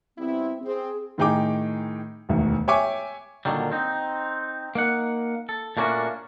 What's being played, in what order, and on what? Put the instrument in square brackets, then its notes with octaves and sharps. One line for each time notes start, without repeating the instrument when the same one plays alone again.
[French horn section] G3 B3 E4 [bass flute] C4
[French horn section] C4 [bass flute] G#4
[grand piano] A2 D#3 D#4 G#4 G5 D6
E1 D2 D#3
C#5 E5 G5 G#5 C#6 D6
[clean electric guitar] A#2 D3 D#3 F#3 G3
C4 D#4
A#3 D#4 F#5
A4
A#2 A3 A#3 C#4 D4 F#4